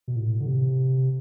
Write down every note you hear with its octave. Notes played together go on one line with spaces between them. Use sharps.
B2
A2
D3
C3